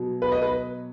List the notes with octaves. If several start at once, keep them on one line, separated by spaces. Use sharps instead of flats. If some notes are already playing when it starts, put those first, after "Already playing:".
Already playing: B2 F#3
B4
D#5
B4